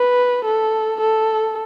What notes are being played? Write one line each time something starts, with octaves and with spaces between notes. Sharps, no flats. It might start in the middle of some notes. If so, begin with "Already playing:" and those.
Already playing: B4
A4
A4